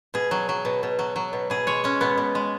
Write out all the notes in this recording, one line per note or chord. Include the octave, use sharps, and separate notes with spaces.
B2 G#4
F#3
F#3
B2
B2
F#3
F#3
B2
B2 G#4
G#3 C#5
G#3 C#4
B2 B3
B2
G#3